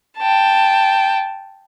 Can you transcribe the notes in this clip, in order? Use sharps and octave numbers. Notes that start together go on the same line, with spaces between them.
G5 A5